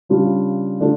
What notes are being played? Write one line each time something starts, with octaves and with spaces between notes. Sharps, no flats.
C#3 G3 D4 F4
D3 A3 D4 F4